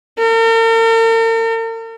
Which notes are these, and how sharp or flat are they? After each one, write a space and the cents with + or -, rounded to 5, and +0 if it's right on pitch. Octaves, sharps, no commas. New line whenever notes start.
A#4 -45